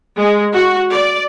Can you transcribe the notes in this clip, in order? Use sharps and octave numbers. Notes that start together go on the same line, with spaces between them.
G#3
F#4
D5